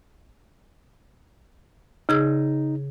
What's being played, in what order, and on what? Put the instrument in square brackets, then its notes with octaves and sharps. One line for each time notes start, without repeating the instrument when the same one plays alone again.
[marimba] C#3 G#4 E6 [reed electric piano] D#4